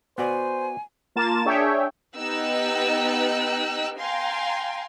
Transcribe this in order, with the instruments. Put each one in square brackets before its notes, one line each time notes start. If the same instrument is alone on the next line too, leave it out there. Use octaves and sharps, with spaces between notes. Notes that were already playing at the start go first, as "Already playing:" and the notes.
[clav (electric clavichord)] B3 F#4 D5 [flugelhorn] C5 [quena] G#5
[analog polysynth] A#3 F4 A#4 A5 A6 E7
D4 G#4 C#5 E5 G5
[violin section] B3 D#4 G4 G5 E6 F#6
F5 G5 G#5 A#5 C6